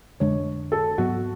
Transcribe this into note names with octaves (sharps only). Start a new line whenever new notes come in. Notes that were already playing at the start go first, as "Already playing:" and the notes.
F2 D3 G#3 D4 C#5
A4
G#2 F#3 B3 F#4